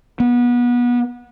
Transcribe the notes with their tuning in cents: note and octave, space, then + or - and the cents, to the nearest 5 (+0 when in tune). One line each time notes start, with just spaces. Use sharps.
B3 -25